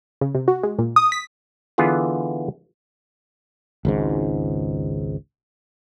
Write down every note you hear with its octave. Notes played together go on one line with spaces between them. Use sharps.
C#3
C3
F#4
G#3
A#2
D#6
B6
D3 E3 B3 F4 G#4
G#1 C#2 G#2